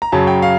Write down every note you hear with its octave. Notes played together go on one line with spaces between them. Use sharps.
A#5
F#2 C#3 F#3 A5
G5
F5